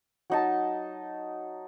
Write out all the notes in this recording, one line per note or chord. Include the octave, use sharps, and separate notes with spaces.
F#3 D#4 A5